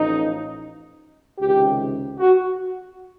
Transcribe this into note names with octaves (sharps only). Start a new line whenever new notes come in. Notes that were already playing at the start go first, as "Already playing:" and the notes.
Already playing: A1 A2 F3 D#4
C#2 C3 D#3 G4
F#4